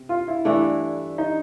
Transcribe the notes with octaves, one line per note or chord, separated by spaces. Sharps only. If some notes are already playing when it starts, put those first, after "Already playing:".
Already playing: C3
F4
E4
G2 E3 A3 D4 E4
D#4